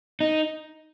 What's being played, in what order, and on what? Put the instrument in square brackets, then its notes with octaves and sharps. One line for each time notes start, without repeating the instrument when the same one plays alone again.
[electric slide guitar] D#4